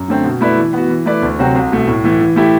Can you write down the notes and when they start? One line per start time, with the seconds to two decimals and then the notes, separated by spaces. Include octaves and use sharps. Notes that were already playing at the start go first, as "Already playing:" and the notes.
Already playing: F#2
0.08 D3 A3 C4
0.24 B2
0.41 A3 E4 B4 D5
0.57 E3
0.73 B3 F#4
0.89 E3
1.06 A3 E4 B4 D5
1.22 D2
1.39 C3 F#3 C4 F#4
1.55 C2
1.71 B2 A3
1.87 A2
2.04 E3 A3
2.20 E3
2.36 A3 E4 G4